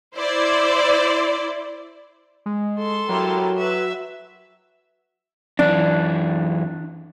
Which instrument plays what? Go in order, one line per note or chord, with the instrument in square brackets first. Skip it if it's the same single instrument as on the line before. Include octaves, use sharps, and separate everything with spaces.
[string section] E4 C5 D5
[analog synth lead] G#3
[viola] A4 C6
[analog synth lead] F#3 [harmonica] E4 G4 A#4
[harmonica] B4 [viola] E5
[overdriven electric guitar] F#2 E3 [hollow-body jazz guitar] D4